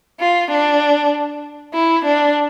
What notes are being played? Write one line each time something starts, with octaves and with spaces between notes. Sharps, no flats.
F4
D4
E4
D4